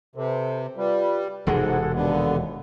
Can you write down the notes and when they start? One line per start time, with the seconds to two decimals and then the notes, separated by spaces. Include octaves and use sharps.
0.16 C3 A4 B4 C5
0.77 G3 F4 B4
1.47 E1 G#2 C3 G#3 G#4 A4 F#5
1.95 D#2 D3 B3